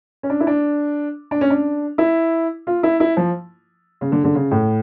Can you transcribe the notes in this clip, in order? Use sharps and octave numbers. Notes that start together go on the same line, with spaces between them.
C#4
D4
E4
D4
D4
C#4
D4
E4
F4
E4
E4
F3
C#3
D3
D3
C#3
A2